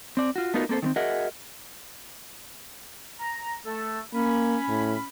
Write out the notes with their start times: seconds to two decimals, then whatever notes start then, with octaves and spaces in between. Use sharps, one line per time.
0.17 C4 D5
0.36 F4 F#4
0.54 A3 B3 D#4 F4 F#4 A#4
0.69 A#3 C4 A4 B4 C5
0.82 D#3 A3 C4
0.96 F#4 G#4 A#4 D#5 E5 F#5
3.19 A#5
3.65 A3 A4
4.14 A#3 C#4 B5
4.69 A2